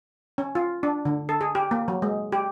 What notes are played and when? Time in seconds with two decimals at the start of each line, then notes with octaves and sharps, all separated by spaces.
0.38 C#4
0.55 F4
0.83 D4
1.05 D3
1.29 A4
1.41 G#4
1.55 G4
1.71 A#3
1.88 F#3
2.02 G#3
2.32 G4